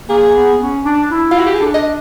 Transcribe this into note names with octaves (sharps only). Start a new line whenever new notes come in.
A#3 G#4
B3
C#4
D4
E4
F4
F#4
G4
G#4
D4 A4
D#5